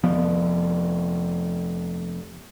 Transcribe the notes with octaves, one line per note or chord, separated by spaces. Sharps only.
F1 F3 B3